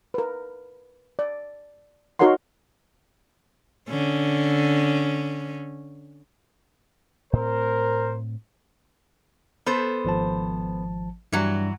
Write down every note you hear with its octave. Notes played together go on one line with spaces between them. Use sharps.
A#4 B4
D5
D#4 F#4 A#4 C#5 F#5 C6
D3 C#4
A2 C4 A#4 C5
B3 A4 C5
G#1 F3 A5
G2 E3 F#3 G3 F#4